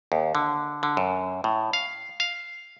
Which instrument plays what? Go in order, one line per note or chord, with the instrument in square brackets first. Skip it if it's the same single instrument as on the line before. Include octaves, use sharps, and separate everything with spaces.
[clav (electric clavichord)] D#2
D3
D3
F#2
A2
F5
F5